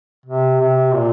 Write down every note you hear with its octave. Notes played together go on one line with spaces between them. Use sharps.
C3
C3
A#2